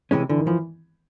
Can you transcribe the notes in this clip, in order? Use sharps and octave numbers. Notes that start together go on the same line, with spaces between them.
C3 E3 G#3 C#4
D3 E3
D#3
E3 F3